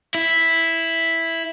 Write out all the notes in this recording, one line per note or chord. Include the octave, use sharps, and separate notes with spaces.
E4